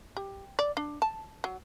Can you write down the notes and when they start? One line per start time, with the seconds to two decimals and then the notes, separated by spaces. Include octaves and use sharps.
0.17 G4
0.59 D5
0.77 D4
1.02 A5
1.44 F#3